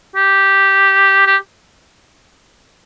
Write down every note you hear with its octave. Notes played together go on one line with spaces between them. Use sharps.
G4
G4